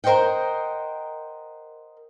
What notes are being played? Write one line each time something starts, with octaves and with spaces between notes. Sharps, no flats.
A#4 C5 D#5 F#5 G5